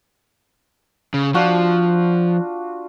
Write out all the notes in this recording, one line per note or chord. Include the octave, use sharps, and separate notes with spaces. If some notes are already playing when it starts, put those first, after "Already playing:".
C#3
F3 D4 F4 F#4